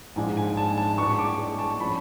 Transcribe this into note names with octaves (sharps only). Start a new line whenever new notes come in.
G#2 F3 G#3 D4 F4 G#5
G#5
A5
A5
A2 G#3 D4 F#4 B4 C#6
D6
A5
F3 A3 C#4 B5